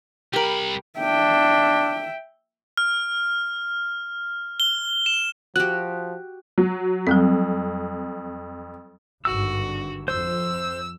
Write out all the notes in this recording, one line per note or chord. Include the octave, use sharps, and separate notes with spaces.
C2 G4 A#4 B5
D4 E5 G5
F6
G7
E7
F3 F#4 G4 F#6
F#3
F2 F#3 G3 C4
G#1 G2 D3 F#4 E6
F2 C5 E6